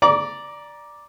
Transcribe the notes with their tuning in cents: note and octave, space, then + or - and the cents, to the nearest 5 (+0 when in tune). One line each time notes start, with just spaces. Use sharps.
D5 +0 A#5 +15 D6 -35